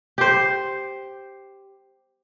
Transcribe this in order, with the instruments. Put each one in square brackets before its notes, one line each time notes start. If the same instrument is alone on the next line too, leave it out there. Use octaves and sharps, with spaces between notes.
[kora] G4 C5